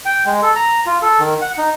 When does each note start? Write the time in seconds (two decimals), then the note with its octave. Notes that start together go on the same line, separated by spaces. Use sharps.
0.05 G5
0.26 G#3
0.43 A4
0.56 A#5
0.86 F4
1.02 A4
1.20 D#3
1.41 F#5
1.58 D#4